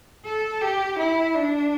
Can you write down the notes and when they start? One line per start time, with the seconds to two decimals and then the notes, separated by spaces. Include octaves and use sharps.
0.25 A4
0.62 G4
0.99 E4
1.35 D4